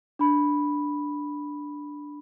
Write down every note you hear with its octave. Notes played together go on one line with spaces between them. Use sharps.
D4 B5